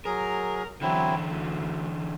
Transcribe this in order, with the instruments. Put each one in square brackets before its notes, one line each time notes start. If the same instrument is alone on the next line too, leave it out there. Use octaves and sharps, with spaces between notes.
[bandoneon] F#3 G#4 [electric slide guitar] A#4
[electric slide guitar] D3 E3 [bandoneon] F#3 C4 E4
[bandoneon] D2